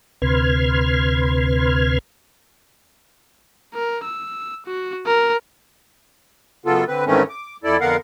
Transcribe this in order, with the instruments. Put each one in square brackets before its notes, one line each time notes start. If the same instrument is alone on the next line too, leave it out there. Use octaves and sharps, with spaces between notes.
[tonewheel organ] D2 C3 B4 C6 F6 G#6
[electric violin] A#4
E6
F#4
A#4
[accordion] F#2 C#3 B3 F4 A4
D3 C4 B4
G#2 D#3 E3 A3 C4 C#4
D6
F2 E4 A4 D5
F2 D3 B3 A#4 F5 F#5